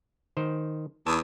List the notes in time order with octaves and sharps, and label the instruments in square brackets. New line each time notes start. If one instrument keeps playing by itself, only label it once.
[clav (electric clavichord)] D#3 C5
[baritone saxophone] E2 [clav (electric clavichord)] A5